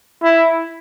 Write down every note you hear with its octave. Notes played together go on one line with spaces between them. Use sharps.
E4